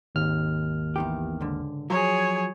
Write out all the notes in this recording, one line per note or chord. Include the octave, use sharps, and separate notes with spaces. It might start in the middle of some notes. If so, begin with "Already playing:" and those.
G#1 D#2 F6
E2 D#3 G4
C#2 G#2 D3
F3 F#3 G#4 C#5